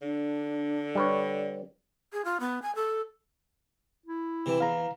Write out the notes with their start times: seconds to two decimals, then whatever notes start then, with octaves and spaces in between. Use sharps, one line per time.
0.01 D3 D4
0.95 G3 B4 C#5
2.13 G#4
2.25 F4
2.40 B3
2.62 G#5
2.75 A4
4.06 E4
4.46 C3 E3
4.60 E2 F5 A#5